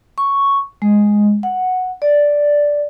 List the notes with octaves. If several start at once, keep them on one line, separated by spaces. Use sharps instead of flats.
C#6
G#3
F#5
D5